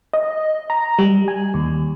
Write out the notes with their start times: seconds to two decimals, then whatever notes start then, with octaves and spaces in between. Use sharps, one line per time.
0.13 D#5
0.70 A#5
0.99 G3
1.28 G#5
1.54 D#2